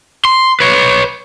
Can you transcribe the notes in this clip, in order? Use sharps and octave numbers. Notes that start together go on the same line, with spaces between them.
C6
B4 C#5